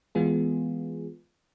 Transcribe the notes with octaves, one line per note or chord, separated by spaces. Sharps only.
E3 G#3 B3 F4 G#4